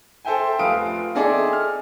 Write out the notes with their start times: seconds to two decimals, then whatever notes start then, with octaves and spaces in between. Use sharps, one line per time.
0.25 A4 C5 E5 G5 G#5
0.59 F1 F4 B4 F5 D#6 D7
1.15 C4 D#4 G#4 A4 D5 E5
1.53 F6